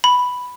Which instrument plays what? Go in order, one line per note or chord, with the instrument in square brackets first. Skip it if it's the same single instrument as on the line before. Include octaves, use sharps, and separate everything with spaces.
[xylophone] B5